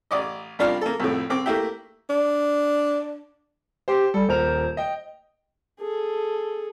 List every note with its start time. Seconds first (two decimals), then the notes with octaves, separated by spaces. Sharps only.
0.11 A1 D5 D#5
0.59 C2 G3 D4 F4 A#4 F6
0.81 A#3 A4
1.00 C2 F2 A2
1.30 C2 C4 D6
1.46 A3 A#3 E4 G4
2.10 D4
3.88 G4 C5 G5 C6
4.14 G3 A4
4.29 D#1 A#4 C5 F7
4.77 D#5 G5
5.80 G#4 A4